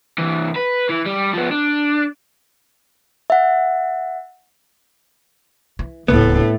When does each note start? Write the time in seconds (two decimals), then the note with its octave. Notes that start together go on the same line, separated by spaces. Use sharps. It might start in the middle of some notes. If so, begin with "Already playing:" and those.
0.19 C2 E3
0.56 B4
0.90 E3
1.07 G3
1.34 F3 B3
1.51 D4
3.30 E5 F#5
5.79 E3
6.08 D1 C#2 A2 A3 B3